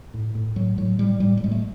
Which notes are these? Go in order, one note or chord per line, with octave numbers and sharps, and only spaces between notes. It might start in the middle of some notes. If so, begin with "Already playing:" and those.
A2
A2
A2 F#3
A2 F#3
A2 G3
A2 G3
G3
A2 G#3
A3